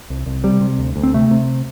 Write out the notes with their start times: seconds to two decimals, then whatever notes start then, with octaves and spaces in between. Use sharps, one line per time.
0.10 C2
0.26 C2
0.44 C3 G3
0.61 C3
0.79 D2
0.96 D2
1.03 C4
1.14 C3 A3
1.31 C3